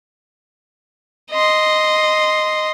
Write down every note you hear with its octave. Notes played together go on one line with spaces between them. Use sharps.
D#5 C6